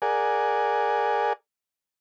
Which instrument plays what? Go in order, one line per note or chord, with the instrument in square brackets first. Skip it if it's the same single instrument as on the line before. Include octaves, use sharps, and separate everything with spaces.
[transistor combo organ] G#4 A#4 D5 F#5 G#5